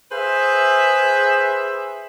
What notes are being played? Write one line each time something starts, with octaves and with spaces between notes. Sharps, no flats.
G#4 B4 C5 E5